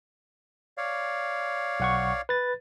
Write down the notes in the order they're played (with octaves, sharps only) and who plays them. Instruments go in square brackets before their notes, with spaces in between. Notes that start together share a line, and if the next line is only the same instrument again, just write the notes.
[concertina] C#5 D5 F5
[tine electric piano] B1 F#5 C#6
B4 A6